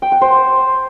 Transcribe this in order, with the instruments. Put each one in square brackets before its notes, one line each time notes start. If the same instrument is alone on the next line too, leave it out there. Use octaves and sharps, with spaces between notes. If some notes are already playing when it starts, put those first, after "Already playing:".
[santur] G5
F#5
C5